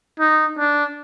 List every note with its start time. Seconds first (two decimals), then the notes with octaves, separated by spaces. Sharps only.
0.19 D#4
0.58 D4